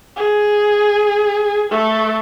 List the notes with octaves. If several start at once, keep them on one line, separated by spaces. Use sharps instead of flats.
G#4
A3 A4